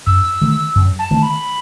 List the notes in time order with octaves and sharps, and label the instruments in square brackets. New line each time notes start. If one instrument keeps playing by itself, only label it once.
[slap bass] F#2 [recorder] E6
[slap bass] D#3 A3
F#2
[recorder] A5
[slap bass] D#3 A3
[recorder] B5